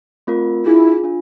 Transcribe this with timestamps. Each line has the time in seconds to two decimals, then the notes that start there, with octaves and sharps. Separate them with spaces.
0.27 A3 C4 F4 A#4
0.65 D4 E4 F4 G#4
1.04 D4 F4